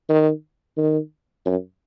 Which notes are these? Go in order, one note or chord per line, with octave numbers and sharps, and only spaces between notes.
D#3
D#3
F#2